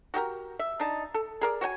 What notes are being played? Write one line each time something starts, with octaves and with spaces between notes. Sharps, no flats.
F#4 G4 A4 A#4
E5
D4 D#4 A5
A4
G#4 A#4 D5
F#4 C#5 G5 G#5